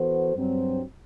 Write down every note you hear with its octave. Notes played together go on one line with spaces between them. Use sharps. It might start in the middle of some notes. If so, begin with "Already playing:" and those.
Already playing: E3 B3 F#4 A4 C5
G2 F#3 C4